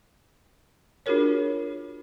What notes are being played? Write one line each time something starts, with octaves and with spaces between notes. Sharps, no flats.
D4 F4 F#4 G#4 A#4 C#5